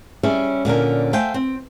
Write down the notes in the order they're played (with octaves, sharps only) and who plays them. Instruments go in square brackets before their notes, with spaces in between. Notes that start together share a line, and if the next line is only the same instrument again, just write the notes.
[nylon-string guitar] G3 C#4 G#4 E5
A#2 D3 C#4 A#4
A3 C5 F5 G5 G#5
C4